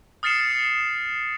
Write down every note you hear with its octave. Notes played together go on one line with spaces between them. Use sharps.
D#6 F6 A6 C7 C#7 E7